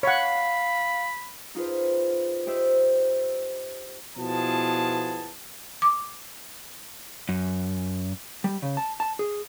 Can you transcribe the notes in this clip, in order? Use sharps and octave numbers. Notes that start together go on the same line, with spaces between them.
C#5 F5 F#5 B5
D#4 F4 G#4 B4 C5
G4 C5 D#5 E5
B2 F3 B3 E4 G#4 A5
D6
F#2
G3
C#3
A5
A5
G#4